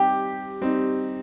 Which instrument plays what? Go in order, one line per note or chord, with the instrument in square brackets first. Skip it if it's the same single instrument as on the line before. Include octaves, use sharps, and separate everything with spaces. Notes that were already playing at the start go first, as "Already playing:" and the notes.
Already playing: [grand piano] G3 C4 D#4 [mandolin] G4
[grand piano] G3 C4 D#4